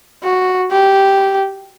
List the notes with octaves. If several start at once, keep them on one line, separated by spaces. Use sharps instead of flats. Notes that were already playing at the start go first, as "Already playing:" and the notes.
F#4
G4